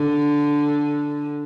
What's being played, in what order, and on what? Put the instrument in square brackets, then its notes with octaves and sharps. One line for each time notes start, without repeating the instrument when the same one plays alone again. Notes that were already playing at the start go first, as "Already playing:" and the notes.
Already playing: [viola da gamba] D3